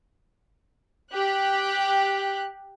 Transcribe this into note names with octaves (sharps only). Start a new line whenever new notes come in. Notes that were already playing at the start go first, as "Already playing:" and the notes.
G4 F#6